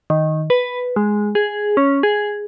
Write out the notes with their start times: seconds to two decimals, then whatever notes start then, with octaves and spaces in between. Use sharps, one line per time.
0.10 D#3
0.50 B4
0.96 G#3
1.35 G#4
1.77 C#4
2.03 G#4